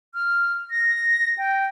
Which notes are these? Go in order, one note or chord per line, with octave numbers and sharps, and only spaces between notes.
F6
A#6
G5